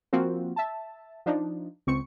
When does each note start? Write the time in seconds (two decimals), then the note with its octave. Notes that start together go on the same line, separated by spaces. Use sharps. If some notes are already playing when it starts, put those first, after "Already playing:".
0.13 F3 A#3 C4 F4 F#4
0.56 E5 A5
1.26 F3 D4 D#4
1.87 C#2 C4 C#6 C#7